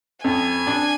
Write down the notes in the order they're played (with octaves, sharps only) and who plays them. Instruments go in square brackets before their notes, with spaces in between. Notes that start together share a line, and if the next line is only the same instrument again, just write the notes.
[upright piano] F2 [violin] G#5
[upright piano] D4